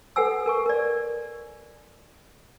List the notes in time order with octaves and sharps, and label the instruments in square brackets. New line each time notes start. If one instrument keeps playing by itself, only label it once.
[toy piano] A4 B4 F#5 G#5 E6
A#4 G#5 C#6
A#4 D5